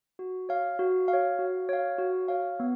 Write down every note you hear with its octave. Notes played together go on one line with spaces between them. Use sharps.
F#4
C#5 F5
F#4
F5
C#5
F#4
C#5 F5
F#4
C#5 F5
B3